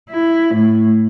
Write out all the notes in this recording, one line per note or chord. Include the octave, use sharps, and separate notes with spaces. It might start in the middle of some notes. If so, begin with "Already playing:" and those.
E4
A2